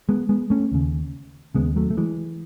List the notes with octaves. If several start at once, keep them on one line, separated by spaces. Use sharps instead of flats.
G#3 B3
G#3 B3
A3 C#4
D#2 C#3
D#2 C#3 G#3 B3
F#3 A3
A3
E3 G#3